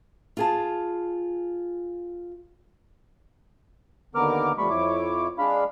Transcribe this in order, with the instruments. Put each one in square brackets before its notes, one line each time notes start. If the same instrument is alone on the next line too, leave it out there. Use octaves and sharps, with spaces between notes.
[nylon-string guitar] F4 G#4 A5
[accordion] D#2 D3 B3 A#4 D6 F6
F2 G3 A3 B5 C#6
F2 E4 C#5 D6
G#3 D4 F5 B5